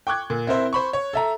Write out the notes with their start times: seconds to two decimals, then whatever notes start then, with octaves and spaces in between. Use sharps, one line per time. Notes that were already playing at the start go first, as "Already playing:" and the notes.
0.07 G5 C#6 D6 F#6 G#6
0.30 A#2
0.47 C4 E4 A#4 C5 E5
0.73 C5 B5 C#6
0.93 C#5
1.13 A4 E5 A#5